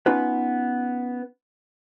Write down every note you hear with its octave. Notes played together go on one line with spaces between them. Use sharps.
B3 C#4 D#4 F4 B4